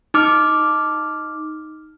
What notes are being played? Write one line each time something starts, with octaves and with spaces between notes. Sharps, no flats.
D#4 D6 F6